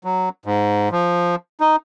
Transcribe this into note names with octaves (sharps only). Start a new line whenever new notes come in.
F#3
G#2
F3
D#4